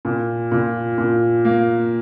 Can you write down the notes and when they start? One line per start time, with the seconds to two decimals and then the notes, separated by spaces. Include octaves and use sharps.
0.05 A#2
0.52 A#2
0.98 A#2
1.45 A#3